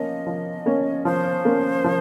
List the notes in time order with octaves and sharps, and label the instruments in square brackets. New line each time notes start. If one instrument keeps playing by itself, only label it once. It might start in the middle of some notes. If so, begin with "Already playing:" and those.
Already playing: [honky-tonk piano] F3 A#3 C#4 [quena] D#5
[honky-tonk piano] F3
A#3 C#4
[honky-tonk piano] F3 [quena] C5
[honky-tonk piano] A#3 C#4
F3